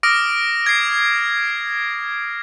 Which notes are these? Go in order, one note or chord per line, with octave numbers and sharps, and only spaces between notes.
D6 D#6 F6 A#6 D7
G#6 C7